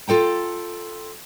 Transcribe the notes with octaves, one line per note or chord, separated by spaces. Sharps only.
F4 A4 G5 A#5